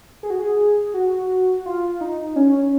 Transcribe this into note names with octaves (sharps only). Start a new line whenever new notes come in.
G#4
F#4
G#4
F#4
F4
D#4
C#4